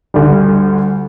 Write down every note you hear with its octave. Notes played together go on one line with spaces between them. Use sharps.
D2 D3 G3